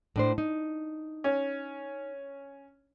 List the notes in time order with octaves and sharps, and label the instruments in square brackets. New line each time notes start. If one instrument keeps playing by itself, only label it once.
[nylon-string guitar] A2 D4 C5
D#4
[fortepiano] C#4